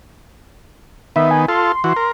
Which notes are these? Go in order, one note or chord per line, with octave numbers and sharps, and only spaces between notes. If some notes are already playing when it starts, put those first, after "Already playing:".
D#3 B3 E5
G#5
F4 A4 C6
E3 F#4
A#4